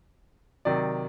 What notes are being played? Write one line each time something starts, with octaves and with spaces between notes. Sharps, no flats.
C3 D#3 F#3 D5